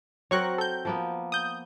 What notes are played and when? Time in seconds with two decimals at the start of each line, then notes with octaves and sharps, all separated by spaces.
0.31 F#3 C4 A#4 C#5 C#6 F#6
0.58 A4 G6
0.85 F3 A#3 B3
1.32 D#6 G6